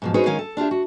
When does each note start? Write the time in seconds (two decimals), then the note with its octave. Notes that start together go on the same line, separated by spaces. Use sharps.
0.02 G#2 B2 F3
0.14 C#4 D#4 F#4 G#4 B4 C5
0.26 D#3 G#3 C#4 F5 G#5
0.39 A4
0.57 D4 F4 G4 E5
0.71 F#4